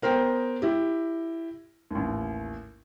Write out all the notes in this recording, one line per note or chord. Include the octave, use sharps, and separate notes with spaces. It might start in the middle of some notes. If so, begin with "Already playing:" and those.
B3 A#4 C5 G5
E4 G4
A1 D#2